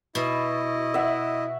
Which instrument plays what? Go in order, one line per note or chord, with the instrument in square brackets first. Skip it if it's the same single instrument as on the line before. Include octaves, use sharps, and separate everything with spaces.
[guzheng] B2 [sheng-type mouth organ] E4 D#5
[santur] E5 F#5